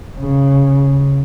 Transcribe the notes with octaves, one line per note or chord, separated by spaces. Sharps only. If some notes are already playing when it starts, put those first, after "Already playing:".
C#3